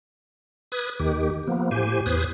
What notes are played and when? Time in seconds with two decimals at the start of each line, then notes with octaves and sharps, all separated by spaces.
0.72 B4 D#6 G#6
0.99 D#2 D#3 G4
1.48 F3 A#3 B3
1.71 A2 G4 C5 G#5
2.06 E2 B4 C5 D#6 G#6